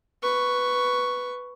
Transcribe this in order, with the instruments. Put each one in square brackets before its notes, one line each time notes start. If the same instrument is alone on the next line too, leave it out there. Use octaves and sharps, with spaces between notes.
[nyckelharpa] B4 C#6